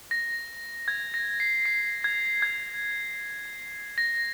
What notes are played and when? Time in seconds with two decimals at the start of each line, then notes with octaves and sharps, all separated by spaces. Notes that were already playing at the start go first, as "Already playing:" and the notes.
0.11 A#6
0.88 G#6
1.14 A#6
1.40 C7
1.65 C7
2.04 G#6
2.42 G#6
3.98 A#6